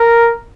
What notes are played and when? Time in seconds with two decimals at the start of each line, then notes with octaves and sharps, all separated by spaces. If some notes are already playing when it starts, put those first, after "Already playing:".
Already playing: A#4